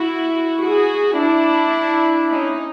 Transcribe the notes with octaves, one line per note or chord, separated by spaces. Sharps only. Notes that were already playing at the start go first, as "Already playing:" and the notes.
Already playing: E4 F#4
F#4 G#4
D4 E4
C#4 D#4